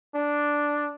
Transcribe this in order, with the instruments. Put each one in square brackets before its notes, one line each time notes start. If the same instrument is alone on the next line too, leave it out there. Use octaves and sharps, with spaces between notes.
[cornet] D4